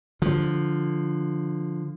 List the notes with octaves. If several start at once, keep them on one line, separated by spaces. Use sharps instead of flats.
D3 F3